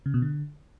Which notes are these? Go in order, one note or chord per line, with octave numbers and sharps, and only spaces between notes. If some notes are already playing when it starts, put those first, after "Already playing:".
C#3
B2
D3